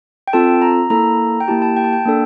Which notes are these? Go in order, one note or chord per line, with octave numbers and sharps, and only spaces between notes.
G5
C4 F4 A4 A5
A#5
A#3 E4 A4 A#5
G5
A#3 E4 G4 A5
A5
G5
A5
G5
A#3 D4 A4